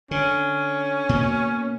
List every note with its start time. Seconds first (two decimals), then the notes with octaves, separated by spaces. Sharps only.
0.11 D3 C#4
1.09 B2 A#3